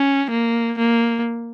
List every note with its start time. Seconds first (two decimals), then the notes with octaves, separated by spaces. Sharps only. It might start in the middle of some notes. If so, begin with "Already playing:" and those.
Already playing: C#4
0.31 A#3
0.78 A#3